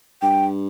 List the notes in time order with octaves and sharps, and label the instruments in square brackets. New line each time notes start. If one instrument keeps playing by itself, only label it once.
[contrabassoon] G2 [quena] G5